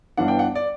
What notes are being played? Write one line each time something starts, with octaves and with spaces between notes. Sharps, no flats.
G1 G2 E3 B3 D4 F#5
G5
F#5
D5